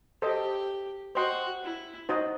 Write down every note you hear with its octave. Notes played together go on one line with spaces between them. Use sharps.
G4 A4 C5 D#5
F#4 C5 D#5 G5 C6
E4
D#4 F#4 C5 D#5